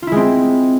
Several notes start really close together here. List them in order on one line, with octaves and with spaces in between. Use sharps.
F4 E4 G#3 C4